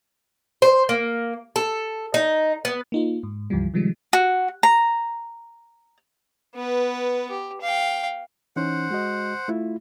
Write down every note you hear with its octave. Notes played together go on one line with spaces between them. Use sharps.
C5
A#3
A4
D#4
B3
A#3 D#4 F4
G#2
C#2 G2 E3 F3 G3
C3 D#3 F3 G3 G#3
F#4
A#5
B3 B4
G4
F5 G5
E3 C#4 D#4 C5 F#5
G#3 F#4 D#5
A3 E4 F4